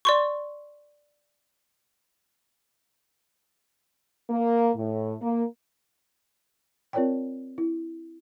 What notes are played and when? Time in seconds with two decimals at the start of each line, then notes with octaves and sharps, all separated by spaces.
0.05 D5 C6 C#6
4.30 A#3
4.76 A2
5.22 A#3
6.93 C4 F4 A#4 C#5 D5 G5
7.58 E4